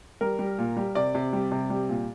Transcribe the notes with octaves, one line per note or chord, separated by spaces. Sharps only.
G3 A#4
G3
A#2
G3
C3 D5
C3
G3
C3
G3
A#2